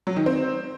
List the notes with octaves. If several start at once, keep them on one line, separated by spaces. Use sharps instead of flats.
F#3
D#3
C4